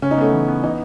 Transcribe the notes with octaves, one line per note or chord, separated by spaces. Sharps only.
C#3 C#4
D#4
A3 B3 C#4
E3
B3
E3 D#4